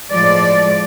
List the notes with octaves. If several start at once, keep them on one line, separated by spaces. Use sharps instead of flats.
A2 F3 G#3 D5